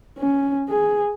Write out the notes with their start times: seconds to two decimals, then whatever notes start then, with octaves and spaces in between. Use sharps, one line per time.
0.18 C#4
0.69 G#4